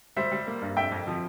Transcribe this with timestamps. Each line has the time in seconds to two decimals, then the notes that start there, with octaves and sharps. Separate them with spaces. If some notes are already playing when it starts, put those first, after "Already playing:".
0.16 G3 C5 E5
0.32 G3
0.47 A#3
0.61 G2
0.76 F2 E5 G5
0.92 F2
1.07 F3